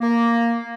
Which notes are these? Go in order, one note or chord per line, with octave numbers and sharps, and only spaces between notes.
A#3